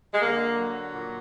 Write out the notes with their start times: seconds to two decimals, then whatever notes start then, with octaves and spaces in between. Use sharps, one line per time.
0.13 G#3
0.21 D3 A#3
0.57 F#3
0.94 A#2